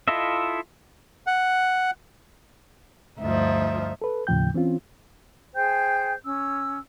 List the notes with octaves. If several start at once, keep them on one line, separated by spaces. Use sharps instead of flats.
E4 F4 A4 D#5 E5
F#5
D2 G2 F3 D#4 E5
A4 B4
D#2 A2 C#3 F3 G5 G6
E3 C4 C#4 F4
G#4 C5 G5 G6
C#4 E6